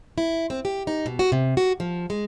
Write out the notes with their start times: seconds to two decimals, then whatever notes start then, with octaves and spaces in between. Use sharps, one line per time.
0.18 E4
0.50 C4
0.65 G4
0.87 D#4
1.06 B2
1.19 F#4
1.32 C3
1.57 F#4
1.80 F3
2.10 G#3